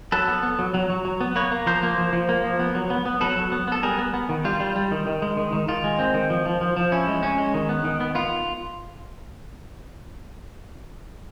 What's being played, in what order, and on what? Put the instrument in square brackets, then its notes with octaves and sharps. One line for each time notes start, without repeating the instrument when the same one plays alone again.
[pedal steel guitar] F#3 A4 B4
B3
B3
F#3
F#3
F#3
F#3
B3
A#3 B4 C#5
A#3
F3 A#4 C5
A#3
F3
F3
A#3
F3
B3
F#3
B3
B3
F#3 A4 B4
F#3
B3
B3 A4
G3 G#4 A#4
B3
B3
D#3
G3 F4
G3
G3
D#3
D#3
G#3
D#3
D#3
D#3 F4
G#3
C4
D#3
F3
F3
F3
F3
C#4 E4
G#3
C#4
G#3
D#3
B3
D#3
B3
B3 F4